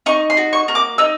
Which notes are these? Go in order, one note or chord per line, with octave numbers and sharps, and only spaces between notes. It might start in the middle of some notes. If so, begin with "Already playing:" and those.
D#4 C#6
C6
F#4
C#6
A#3
D6
D#4 E6